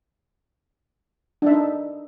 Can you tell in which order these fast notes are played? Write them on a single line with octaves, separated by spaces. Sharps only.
D4 E5 D#4